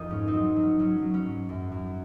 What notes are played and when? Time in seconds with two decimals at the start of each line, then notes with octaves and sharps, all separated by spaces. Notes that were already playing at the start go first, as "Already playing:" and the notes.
Already playing: F2 F3 D#4 F4 G#4 A#4
0.10 G#2 C#4
0.27 C4 D#4
0.33 F#3
0.56 F#3
0.62 C#4
0.79 F#3 C#4
1.02 F#3
1.14 C#4
1.25 G#2
1.49 F#2
1.72 F#2